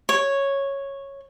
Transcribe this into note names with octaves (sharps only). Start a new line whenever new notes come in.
C#5